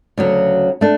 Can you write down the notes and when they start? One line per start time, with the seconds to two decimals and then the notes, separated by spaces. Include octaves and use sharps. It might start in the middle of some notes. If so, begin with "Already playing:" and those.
0.18 D2 C#3 F#3
0.81 A3 D4